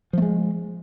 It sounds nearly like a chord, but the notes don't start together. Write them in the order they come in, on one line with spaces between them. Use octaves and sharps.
F3 A3 G#3